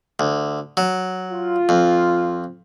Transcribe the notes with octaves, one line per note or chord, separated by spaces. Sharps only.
D2
F#3
F4
F2